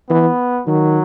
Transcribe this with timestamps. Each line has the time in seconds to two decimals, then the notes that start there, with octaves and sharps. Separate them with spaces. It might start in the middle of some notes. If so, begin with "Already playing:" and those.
0.10 E3 B3
0.67 D#3 F#3